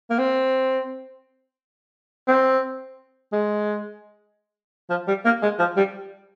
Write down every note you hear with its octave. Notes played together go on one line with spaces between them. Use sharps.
A#3
C4
C4
G#3
F3
G3
A#3
G#3
F3
G3